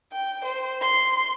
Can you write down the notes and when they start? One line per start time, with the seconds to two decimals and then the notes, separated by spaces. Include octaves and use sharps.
0.11 G5
0.43 C5
0.80 C6